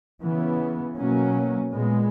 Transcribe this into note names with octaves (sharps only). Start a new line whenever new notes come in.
C#3 E3 B3
B2 F#3 A#3 C#4
A#2 G#3 B3